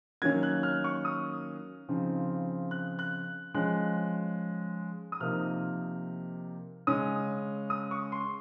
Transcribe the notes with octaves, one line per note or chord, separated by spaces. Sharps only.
D#3 F#3 A#3 C#4 G#6
F#6
F6
C#6
D#6
C#3 F3 C4 D#4
F#6
F#6
F3 G#3 C#4 F#6
D#6
C3 F3 A#3 D#4 F6
C#3 G#3 C#4 D#6
D#6
C#6
C6